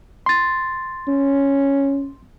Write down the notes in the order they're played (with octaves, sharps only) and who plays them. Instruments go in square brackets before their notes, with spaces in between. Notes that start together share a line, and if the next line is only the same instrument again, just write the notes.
[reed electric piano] C6 A6
[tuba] C#4